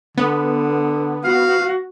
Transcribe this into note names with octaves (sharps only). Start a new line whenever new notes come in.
D3 B3
F#4 F5